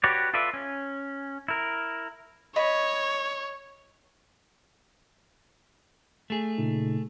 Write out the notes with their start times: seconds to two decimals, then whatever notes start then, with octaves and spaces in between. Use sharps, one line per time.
0.04 F#4 G4 B4 C#5 D5
0.34 F4 A4 B4 D5 E5
0.54 C#4
1.48 E4 A#4
2.56 C#5 D#5 B5
6.30 A3 G#4
6.58 A#2 C#3 D#4